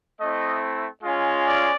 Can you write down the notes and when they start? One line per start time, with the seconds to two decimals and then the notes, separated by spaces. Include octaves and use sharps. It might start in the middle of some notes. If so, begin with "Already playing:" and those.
0.19 A3 C4 E4 D#5
1.02 G#3 C#4 F4
1.45 D5